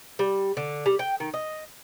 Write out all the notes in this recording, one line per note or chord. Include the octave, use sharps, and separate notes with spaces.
G3
D3
G3
G5
D#3
D#5